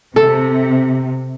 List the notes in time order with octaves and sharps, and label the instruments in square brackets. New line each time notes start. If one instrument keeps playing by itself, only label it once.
[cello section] C3 [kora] A4